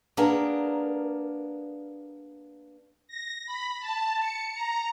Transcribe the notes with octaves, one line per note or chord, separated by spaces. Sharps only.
A#3 B3 D4 G#4 A#4
A#6
B5
A5
C#7
A#5